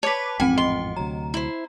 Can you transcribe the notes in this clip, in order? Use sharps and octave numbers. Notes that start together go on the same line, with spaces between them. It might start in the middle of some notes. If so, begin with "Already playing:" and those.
B4 C#5 A5 D6 B6
A1 F2 G#2 C4 G5 G#5
D#5 C6
D2 C3 F#3 A#5
E4 C5